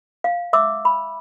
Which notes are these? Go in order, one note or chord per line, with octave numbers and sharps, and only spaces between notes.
F5
E5 D6 E6
B5